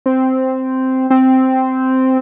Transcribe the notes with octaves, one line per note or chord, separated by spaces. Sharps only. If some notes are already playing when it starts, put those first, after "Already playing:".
C4
C4